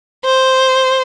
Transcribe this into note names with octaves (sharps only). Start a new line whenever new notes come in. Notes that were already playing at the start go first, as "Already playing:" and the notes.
C5